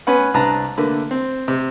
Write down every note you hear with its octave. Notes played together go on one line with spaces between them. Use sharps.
B3 C#4 B4 F#5
C2 D4 B4 A5 A#5
D3 A3 A#3 B4
C4
C3